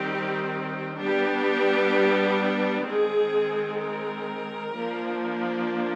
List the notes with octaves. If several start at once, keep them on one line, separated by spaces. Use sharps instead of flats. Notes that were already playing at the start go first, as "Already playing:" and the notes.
Already playing: D#3 G3 C4 G4
G3 B3 D4 G4
D#3 G#3 C4 G#4
A#4
F3 A#3 D4